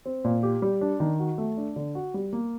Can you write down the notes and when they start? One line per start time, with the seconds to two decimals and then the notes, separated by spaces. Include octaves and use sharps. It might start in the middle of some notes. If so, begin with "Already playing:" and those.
0.06 C4
0.24 A#2
0.43 G4
0.62 G3
0.81 D4
1.00 D#3
1.19 F#4
1.38 A3
1.57 D4
1.76 D3
1.95 F#4
2.14 G3
2.33 A#3